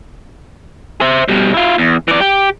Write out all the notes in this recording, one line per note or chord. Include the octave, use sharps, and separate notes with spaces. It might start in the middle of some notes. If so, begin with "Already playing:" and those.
C5 E5
B2 G3
E4 F4
E2
E3 D5
G4